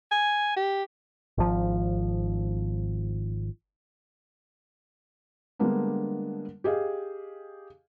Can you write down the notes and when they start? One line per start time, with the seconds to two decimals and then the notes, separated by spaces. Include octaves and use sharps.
0.12 G#5
0.57 G4
1.38 G#1 F3
5.59 D3 G3 G#3 A#3 B3 D4
6.64 G4 G#4 D#5 F5